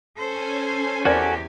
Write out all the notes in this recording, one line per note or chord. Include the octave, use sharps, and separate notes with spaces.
C#4 A4 C5 G#5
E2 F#4 G4 A4 A#4 C5 D5 G#5